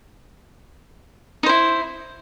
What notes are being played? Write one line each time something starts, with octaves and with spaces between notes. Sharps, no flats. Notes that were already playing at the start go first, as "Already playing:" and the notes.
D#4 E4 C5